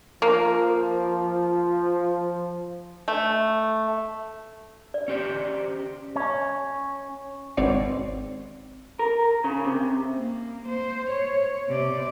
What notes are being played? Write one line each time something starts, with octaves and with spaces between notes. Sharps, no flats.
F3 A#3
A3
D5
C#4 G4 C5
C#4
G#1 B2 C4 C#5 D5 C7
A#4
C#3
C3
A#3
C5
C#5
C3 D5